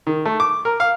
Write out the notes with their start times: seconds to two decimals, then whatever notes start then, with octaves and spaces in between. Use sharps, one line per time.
0.07 D#3
0.25 A3
0.40 D6
0.65 A#4
0.80 F5